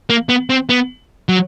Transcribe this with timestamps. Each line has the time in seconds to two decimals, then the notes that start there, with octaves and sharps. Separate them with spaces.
0.10 A#3
0.29 B3
0.50 C4
0.69 B3
1.29 F#3